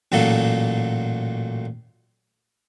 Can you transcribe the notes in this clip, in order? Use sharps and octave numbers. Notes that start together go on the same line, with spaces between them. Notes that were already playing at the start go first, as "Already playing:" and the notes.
A1 A#2 F#3 A3 A#3 A4